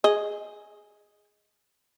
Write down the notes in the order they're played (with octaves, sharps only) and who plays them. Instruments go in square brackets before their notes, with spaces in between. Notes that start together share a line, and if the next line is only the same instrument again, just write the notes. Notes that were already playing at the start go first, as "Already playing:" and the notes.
[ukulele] G#4 [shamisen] D#5